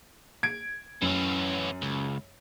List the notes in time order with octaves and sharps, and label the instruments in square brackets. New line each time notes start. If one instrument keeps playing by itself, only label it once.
[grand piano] G#6 D7
[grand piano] F#2 [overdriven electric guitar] E3 C#4
[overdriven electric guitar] C#2